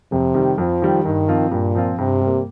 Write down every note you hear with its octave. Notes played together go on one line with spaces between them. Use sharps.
F2 C3
D#3 G3
F2 F3
D#3 G3
G2 D#3
F3 C4 F4
G2 A#2
F3 C4 F4
G2 C3
G3 A#3